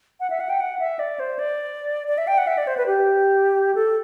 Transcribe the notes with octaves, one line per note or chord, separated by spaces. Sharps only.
F#5
E5
F#5
G5
F#5
E5
D5
C5
D5
D5
E5
G5
F#5
E5
D5
C5
B4
G4
A4